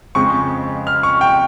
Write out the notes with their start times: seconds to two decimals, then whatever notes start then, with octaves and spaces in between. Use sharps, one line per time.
0.15 F2 C#3 G#3 C4 C#6
0.87 F6
1.03 C#6
1.21 G5